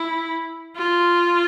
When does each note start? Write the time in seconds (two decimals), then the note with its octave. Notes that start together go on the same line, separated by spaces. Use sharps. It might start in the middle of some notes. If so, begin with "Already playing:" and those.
Already playing: E4
0.77 F4